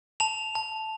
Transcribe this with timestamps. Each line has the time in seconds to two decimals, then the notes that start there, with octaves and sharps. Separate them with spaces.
0.20 A5 F7
0.55 A5